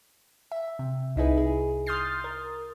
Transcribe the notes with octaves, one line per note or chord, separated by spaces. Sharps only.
E5
C3
C2 D#4 E4 G#4 B4
G#4
C6 D#6 F6 G6 A6 C7
A#4